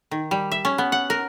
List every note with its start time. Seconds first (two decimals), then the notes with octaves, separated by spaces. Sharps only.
0.11 D#3
0.31 G3
0.52 E5
0.65 C#4
0.78 B3
0.92 F#5
1.10 A#4